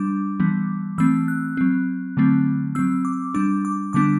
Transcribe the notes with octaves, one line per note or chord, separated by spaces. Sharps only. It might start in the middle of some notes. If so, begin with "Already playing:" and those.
Already playing: G3 D4 D6
E3 G3 B3
E3 A3 C4 E6
F#6
F#3 C4
D3 F#3 A3 C4
F#3 C4 E6
D6
G3 D4 D6
D6
D3 G3 B3 D4 D6